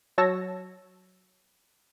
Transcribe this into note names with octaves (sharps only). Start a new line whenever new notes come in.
F#3 F#4 C#5 A5 E6 A#6